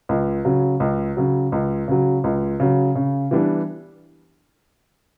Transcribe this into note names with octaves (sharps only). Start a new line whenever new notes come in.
C#2
C#3 F#3
C#2
C#3 F#3
C#2
C#3 F#3
C#2
C#3 F#3
C#3
E3 G3 B3 D4